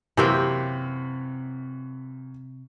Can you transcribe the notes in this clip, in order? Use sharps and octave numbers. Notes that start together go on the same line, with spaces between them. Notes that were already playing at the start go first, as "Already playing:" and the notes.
F#2 C3 E3 A#3 C4 G5